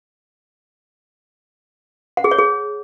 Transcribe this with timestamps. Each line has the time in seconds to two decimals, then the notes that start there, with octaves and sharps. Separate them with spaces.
2.17 F#5
2.24 G#4
2.31 C#5
2.38 G#4